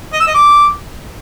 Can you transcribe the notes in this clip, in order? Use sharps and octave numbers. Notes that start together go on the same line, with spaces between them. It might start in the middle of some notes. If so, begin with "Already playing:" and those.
D#5
E6
D#5
D6